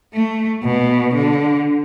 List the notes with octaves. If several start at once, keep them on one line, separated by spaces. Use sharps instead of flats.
A3
B2
D3